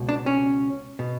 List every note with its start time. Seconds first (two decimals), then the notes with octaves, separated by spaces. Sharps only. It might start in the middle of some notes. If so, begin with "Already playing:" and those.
Already playing: C#2 B2
0.09 D4
0.26 C#4
0.99 B2